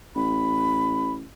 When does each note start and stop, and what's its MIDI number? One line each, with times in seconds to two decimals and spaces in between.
0.16 1.27 33
0.16 1.12 83